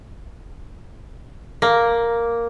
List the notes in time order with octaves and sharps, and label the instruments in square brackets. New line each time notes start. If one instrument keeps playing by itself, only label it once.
[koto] A#3